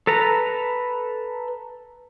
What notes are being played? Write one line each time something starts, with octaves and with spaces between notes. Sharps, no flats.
A4 B4 A#5